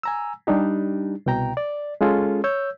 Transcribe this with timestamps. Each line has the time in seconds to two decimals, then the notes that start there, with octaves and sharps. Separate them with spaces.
0.03 G#5 A#5 E6
0.47 G3 D4 D#4 G4
1.26 C2 B2 G5 A#5
1.57 D5
2.01 G#3 C#4 F4 G#4 A4
2.44 C#5 E6 G6